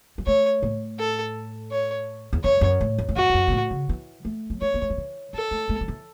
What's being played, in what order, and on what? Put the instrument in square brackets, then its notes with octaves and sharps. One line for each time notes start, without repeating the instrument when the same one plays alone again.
[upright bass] F#3
[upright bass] A3 [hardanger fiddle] C#5
[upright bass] A2
[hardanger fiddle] A4
C#5
[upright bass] E2
[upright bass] F#2 [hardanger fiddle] C#5
[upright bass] F#2
A2
F#2
A2
[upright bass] F#2 [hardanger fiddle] F#4
[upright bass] E2
F#2
B2
A2
C#3
E3
A3
F#3
[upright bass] A3 [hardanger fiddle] C#5
[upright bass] B3
A3
F#3
E3
[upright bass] F#3 [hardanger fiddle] A4
[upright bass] A3
A3
F#3
E3